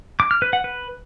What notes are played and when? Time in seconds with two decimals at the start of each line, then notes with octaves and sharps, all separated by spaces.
0.20 D6
0.31 F6
0.42 B4
0.53 F#5
0.64 B4